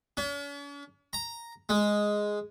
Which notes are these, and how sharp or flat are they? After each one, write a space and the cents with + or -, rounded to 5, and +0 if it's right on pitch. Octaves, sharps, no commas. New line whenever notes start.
C#4 +45
A#5 +0
G#3 +0